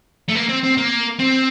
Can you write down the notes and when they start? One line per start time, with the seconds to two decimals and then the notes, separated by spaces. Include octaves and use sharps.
0.29 A3
0.36 A#3
0.49 C4
0.64 C4
0.77 A#3
1.20 C4